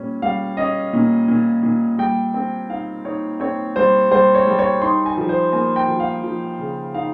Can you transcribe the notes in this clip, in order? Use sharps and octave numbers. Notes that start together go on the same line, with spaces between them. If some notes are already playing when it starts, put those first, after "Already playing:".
Already playing: A#2 G3 C#4
G3 F5
C#4 D#5
A#2
A#2
A#2
G3 G5
C4
D#4 F5
D#4 C#5
C4 C#5
G3 C5
G3 C5
C#5
G3
C#5
D#4 C6
G#5
F3
C5
A#3 G#5
G5
F3
F5
F3
C#3
D#4 F5